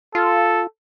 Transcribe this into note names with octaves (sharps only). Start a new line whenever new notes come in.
F4 A4